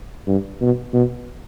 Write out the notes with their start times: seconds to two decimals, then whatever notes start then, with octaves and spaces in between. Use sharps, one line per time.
0.27 G2
0.61 B2
0.93 B2